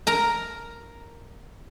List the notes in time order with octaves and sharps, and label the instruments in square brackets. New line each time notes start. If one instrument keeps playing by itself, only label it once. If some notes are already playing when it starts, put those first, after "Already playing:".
[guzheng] A#4 A#5